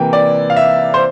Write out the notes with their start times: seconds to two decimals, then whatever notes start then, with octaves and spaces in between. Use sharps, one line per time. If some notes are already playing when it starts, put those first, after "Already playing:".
Already playing: C3 E3 A#3 G5
0.13 D5
0.50 F5
0.56 E5
0.94 C5